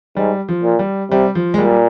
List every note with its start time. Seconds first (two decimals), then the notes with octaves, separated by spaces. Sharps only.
0.17 G#2 G3
0.49 F3
0.64 A#2
0.79 G3
1.11 C3 G3
1.35 F3
1.54 G#3
1.58 A#2 G3